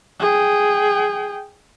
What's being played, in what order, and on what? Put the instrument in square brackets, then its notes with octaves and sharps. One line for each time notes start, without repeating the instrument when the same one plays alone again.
[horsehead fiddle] G#4 G5